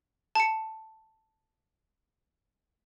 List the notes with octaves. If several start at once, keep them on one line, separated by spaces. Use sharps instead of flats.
A5 C#7